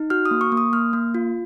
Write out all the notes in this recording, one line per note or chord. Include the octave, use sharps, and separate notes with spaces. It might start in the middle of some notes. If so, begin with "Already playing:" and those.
Already playing: D#4
F#4 F6
D#6
A#3
C#6
A#3
D#6
A#3 F6
A#3
F4